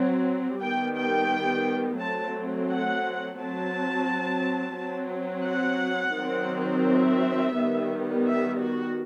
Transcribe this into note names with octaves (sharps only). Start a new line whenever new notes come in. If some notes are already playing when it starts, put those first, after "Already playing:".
Already playing: F#3 C4
D#3 G3 B3 G5
G5
F#3 A3 C4 A5
F#5
F#3 C4 A5
F#3 C4
F#5
D#3 F#3 C4
E5
D#3 G3 B3
E5
F#4